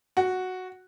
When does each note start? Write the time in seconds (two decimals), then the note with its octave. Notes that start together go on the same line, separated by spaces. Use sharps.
0.17 F#4